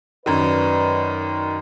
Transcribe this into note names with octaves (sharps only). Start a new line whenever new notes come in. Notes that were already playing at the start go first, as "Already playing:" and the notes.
F#2 D#3 B4 D5